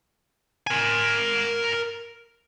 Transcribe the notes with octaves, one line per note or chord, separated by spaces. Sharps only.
A#4 G#5